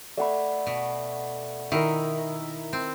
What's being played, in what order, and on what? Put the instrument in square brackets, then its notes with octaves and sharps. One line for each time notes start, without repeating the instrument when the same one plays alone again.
[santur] A3 C#6 [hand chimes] D5 F#5 B5
[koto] B2
[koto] D#3 [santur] E4 A#4
[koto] C4